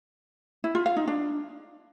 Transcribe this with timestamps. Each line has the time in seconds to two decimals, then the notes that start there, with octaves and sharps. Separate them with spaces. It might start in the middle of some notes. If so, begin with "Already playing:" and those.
0.64 E4
0.75 F4
0.86 F5
0.97 D#4
1.07 D4